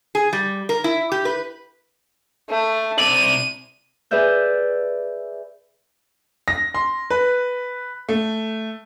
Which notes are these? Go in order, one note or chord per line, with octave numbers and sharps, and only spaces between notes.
G#4
G3
A#4
E4
G4
B4
A3
C3 D5 D#7
G#4 B4 D5 E5 G6
A#6
C6
B4
A3